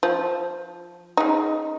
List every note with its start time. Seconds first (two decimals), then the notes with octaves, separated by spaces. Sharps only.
0.03 F3
1.17 C#3 D#4